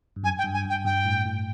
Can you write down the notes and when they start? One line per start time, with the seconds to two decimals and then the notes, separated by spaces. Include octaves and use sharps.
0.16 G2
0.23 F#2 G#5
0.38 G5
0.44 G2
0.54 G#5
0.65 G2
0.70 G5
0.85 G2 G5
1.05 A2
1.25 A2